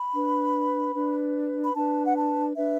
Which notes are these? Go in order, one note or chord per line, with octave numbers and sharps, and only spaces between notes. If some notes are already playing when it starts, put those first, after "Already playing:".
Already playing: B5
D4 B4
D4 B4
B5
D4 B4 A5
F#5
A5
D4 B4 E5